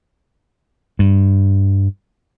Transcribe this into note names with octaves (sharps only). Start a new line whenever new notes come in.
G2